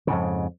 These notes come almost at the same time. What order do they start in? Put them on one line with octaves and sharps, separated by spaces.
C#3 G#2 F2